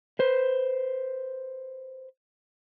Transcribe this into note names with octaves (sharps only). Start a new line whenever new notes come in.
B4 C5